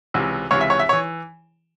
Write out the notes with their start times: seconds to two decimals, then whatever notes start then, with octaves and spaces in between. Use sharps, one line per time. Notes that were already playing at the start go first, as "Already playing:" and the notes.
0.14 C#2 C3 E3
0.51 C#2 C3 E3 C#5
0.61 E5
0.70 C#5
0.79 E5
0.89 C#5
0.93 E3